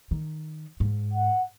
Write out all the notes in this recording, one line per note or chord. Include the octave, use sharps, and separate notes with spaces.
D#3
G#2
F#5